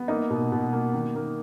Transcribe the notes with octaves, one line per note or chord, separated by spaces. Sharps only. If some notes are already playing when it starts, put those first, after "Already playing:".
Already playing: B3
A#3 D#4
B2
B2
A#3
D#3
A#3